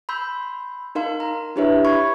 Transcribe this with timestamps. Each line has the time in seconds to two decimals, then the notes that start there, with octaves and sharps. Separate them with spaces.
0.09 B5 C6 E6 G6
0.95 D#4 A#4 F5 C6
1.20 A#5
1.56 D4 E4 G4 B4 C#5 E5
1.85 B5 C#6 G#6